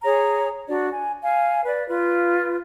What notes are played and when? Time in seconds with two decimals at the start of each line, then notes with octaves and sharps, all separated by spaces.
0.03 G#4 C#5 A#5
0.67 D4 F#4 D5
0.90 G#5
1.23 F5 G#5
1.65 B4 D5
1.88 F4 B4